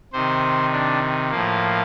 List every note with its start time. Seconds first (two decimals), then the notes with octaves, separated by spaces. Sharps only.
0.13 C3 D#3 C5
0.72 D4
1.31 A2 F3 A#3